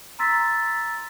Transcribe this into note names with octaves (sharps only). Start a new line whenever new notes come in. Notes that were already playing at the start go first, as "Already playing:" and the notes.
A#5 C6 E6 A6 B6